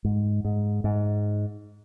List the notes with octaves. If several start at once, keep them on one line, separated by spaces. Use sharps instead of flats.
G#2
G#2
G#2